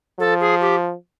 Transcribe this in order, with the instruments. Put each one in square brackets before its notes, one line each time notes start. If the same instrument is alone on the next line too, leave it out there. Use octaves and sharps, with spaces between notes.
[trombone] F3 [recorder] A4
[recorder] G#4
G4